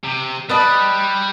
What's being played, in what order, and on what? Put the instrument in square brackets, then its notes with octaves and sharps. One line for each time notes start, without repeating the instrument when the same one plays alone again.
[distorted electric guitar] C3
[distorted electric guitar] G3 [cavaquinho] B4 D#5 A5